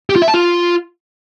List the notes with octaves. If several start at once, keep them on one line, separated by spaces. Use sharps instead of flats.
G4
F4
E5
A5
F4